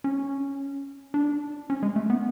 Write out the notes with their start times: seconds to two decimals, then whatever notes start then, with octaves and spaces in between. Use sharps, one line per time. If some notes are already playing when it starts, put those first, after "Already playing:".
0.04 C#4
1.14 D4
1.70 C#4
1.83 G#3
1.96 A3
2.10 B3